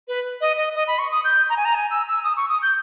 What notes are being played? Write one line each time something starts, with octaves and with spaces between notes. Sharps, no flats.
B4
D#5
D#5
D#5
B5
C#6
D#6
G6
A#5
G#5
A#5
G#5
E6
E6
D#6
C#6
D#6
G6